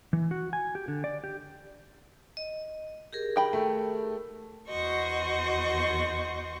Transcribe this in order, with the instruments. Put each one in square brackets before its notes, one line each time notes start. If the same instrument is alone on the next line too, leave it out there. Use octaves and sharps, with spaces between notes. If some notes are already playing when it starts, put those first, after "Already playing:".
[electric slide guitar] E3
F#4
G#5
G4
D3
D5
G4
[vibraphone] D#5
G4 G#4 A#4
[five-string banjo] D#3 G5 B5
[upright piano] A3
[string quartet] E2 F#4 C5 D#5 C#6